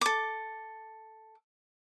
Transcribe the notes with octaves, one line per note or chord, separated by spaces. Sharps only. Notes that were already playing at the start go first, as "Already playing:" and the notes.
A4 D6